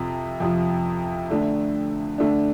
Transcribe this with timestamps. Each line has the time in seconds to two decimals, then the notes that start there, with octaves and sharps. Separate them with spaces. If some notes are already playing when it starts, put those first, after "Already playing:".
Already playing: F2 C3 F3
0.40 F2 C3 F3
1.30 D3 A3 D4
2.18 D3 A3 D4